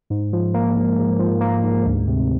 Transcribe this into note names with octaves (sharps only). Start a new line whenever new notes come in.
G#2
F3
A#3
G#2
G#2
F3
A#3
G#2
D2
C3